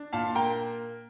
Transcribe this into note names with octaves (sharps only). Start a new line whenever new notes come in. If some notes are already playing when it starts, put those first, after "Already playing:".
Already playing: D4
A#2 F5 A5
A#3 G5 A#5